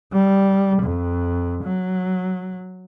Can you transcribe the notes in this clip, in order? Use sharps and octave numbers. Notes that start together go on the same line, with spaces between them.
G3
F2
F#3